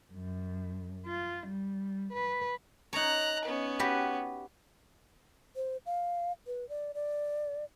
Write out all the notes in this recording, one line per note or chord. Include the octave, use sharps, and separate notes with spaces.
F#2
F4
G3
B4
D#4 C#5 A#5 F#6
B3 C#4
F#4 G4 B4
C5
F5
B4
D5
D5